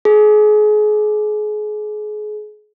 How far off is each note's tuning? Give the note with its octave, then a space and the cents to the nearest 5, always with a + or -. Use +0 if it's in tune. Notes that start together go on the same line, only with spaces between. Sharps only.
G#4 +30